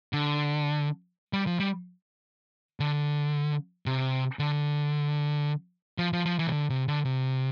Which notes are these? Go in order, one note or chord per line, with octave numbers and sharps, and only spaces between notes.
D3
G3
F3
G3
D3
C3
D3
F3
F3
F3
E3
C3
D3
C3
D3
C3